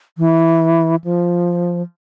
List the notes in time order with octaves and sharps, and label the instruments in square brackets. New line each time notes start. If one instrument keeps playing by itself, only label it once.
[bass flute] E3
F3